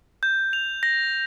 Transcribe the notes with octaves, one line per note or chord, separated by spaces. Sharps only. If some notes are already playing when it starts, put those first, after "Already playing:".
G6
F7
A#6